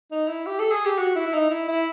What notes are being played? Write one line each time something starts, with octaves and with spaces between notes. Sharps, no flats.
D#4
E4
G4
A4
G#4
G4
F#4
E4
E4
D#4
E4
E4